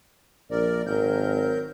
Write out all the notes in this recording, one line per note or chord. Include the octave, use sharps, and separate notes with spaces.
A#1 A#4 D5
G#1 F#3 A#4 G6